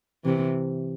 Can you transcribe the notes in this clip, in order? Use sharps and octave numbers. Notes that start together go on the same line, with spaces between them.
C3 E3